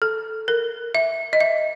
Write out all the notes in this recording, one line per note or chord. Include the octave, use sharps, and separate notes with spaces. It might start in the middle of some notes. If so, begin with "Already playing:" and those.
A4
A#4
E5
D#5
E5